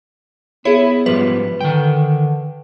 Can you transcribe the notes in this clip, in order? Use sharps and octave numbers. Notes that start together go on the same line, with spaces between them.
B3 E4 G#4 C#5
G#2 F3 G3 B4
D3 D#3 G5